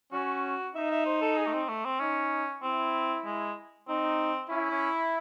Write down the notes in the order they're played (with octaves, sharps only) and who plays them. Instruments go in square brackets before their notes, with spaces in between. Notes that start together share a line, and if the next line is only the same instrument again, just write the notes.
[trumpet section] C#4 [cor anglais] F#4
[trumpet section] D#4 [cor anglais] E5
[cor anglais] E5
C5
A4
G#4
A3
C4
A3
C4
[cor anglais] C#4 [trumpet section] D#4
[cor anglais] C4 [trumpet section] E4
[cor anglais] G#3
[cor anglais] C4 [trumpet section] D#4
[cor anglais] C#4 [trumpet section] E4
[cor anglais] C#4